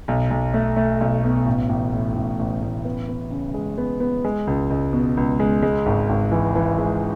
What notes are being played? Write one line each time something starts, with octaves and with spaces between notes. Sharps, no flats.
B1
B1
A3
A3
B1
B2
A1
A1
A2
A1
A1
A1
B3
B3
C#3
G#3
B3
B3
G#3
C#2
C#2
B2
C#2
G#3
G#3
G#1
G#1
E3
E3
G#3